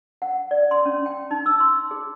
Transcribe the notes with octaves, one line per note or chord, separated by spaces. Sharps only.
F#5
D5
C6
C#4
G5
D#4
E6
C6
G#4